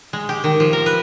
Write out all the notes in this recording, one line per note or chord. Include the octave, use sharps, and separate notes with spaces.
G#3
G4
D#3
F3
A#4
B4